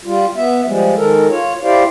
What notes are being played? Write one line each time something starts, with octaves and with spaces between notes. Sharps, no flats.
G3 F4
B3 E5
F3 G3 G#3
D#3 G#3 A4 A#4
F4 C#5
E4 G4 C5 D5 F5